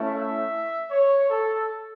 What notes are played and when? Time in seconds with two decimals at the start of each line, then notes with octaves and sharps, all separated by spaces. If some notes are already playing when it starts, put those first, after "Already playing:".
Already playing: A3 C#4 E4
0.15 E5
0.91 C#5
1.30 A4